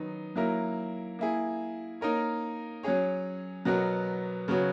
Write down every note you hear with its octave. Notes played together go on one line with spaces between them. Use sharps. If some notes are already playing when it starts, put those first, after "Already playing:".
Already playing: D#3 F#3 B3 D#4
F#3 A#3 E4 A#4
A#3 E4 G#4
A#3 D#4 A#4 C#5
F#3 C#4 G#4 C#5
B2 F#3 B3 F#4 A#4
C#3 F#3 B3 F#4 C#5